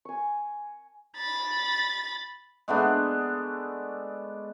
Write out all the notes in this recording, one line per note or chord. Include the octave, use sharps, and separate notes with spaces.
G#5 C#6
B5 A6
G#3 A3 B3 D4